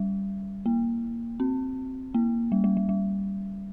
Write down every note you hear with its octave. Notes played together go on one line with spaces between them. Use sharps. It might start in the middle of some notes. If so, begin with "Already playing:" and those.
Already playing: G3
A#3
C4
A#3
G3
G3
G3
G3